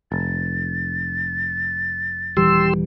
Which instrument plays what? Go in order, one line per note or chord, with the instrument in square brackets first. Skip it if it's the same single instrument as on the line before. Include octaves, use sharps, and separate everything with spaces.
[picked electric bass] F1 [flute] A6
[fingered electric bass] D#1 E3 G3 [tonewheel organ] G4 C6 E6